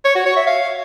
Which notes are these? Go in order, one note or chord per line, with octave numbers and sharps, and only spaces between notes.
C#5
F#4
C#5
E5
F5